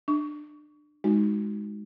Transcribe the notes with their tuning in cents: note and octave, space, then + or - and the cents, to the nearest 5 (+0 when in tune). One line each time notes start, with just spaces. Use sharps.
D4 +25 C#6 +35
G#3 +0 D#4 +0 F#4 +0